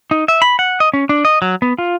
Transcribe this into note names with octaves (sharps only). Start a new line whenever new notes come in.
D#4
E5
B5
F#5
D#5
C#4
D4
D#5
F#3
B3
F4